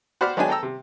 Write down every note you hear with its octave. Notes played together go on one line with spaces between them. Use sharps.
F#4 C5 D5 B5 F6
F#3 G#3 B3 D4 G5 G#5
A4 G5 A#5 E6
C3